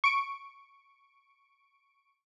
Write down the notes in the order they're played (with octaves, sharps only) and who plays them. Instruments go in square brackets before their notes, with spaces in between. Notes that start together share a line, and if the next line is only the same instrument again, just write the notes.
[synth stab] C#6 D7